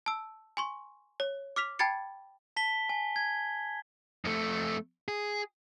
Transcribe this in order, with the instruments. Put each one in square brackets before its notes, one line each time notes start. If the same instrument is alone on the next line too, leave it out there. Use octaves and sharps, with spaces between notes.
[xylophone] A5 E6
G#5 C6 C#6
C#5
D6 F6 B6 F7
G5 A5 B5 G#6 A6 C#7
[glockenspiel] A5 B6 G7
G#5
G#6
[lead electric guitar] F2 A3
G#4